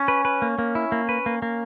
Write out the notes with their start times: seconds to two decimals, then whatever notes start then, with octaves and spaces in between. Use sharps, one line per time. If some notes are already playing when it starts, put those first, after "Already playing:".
Already playing: C#4
0.08 B4
0.25 B4
0.42 A#3
0.59 A#3
0.75 E4
0.92 A#3
1.09 B4
1.26 A#3
1.42 A#3